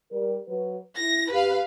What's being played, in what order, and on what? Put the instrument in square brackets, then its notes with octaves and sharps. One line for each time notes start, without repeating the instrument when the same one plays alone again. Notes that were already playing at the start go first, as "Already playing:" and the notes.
[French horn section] G3 A#4
F#3 F#4 B4
[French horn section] E4 [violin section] A#6
[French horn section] F#2 G4 [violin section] B4 F5